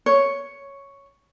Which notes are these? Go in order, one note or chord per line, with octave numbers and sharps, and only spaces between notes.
C#5